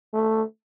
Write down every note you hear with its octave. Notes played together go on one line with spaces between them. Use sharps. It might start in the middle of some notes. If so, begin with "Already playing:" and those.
A3